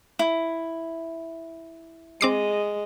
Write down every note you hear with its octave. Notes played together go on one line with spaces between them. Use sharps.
E4
G#3 C4 D#5 D6 C7